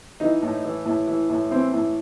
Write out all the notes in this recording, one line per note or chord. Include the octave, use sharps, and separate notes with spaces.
E3 D#4
A2
E3
A2
E3
A2
E3 C4
A2